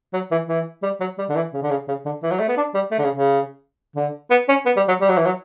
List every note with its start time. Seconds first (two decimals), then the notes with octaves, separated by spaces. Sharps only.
0.13 F#3
0.31 E3
0.49 E3
0.83 G3
1.00 F#3
1.18 G3
1.29 D3
1.35 E3
1.53 C#3
1.62 D3
1.70 C#3
1.88 C#3
2.06 D3
2.23 E3
2.31 F#3
2.40 A3
2.48 B3
2.57 D4
2.74 G3
2.91 A3
2.99 D3
3.04 C#3
3.15 C#3
3.96 D3
4.31 B3
4.49 C#4
4.66 B3
4.76 G3
4.88 F#3
5.01 G3
5.09 F#3
5.18 E3
5.26 F#3